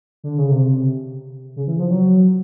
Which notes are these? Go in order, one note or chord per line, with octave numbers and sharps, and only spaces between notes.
D3
C#3
C3
C#3
E3
F3
F#3